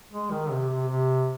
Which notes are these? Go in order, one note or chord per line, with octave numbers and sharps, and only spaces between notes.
G#3
D#3
C3
C3
C3